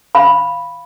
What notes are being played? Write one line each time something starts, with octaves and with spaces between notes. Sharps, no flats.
F5 B5